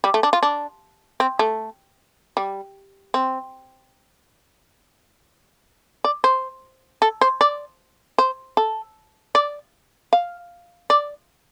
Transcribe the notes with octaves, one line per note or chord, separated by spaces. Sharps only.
G3
A3
D4
F4
D4
C4
A3
G3
C4
D5
C5
A4
C5
D5
C5
A4
D5
F5
D5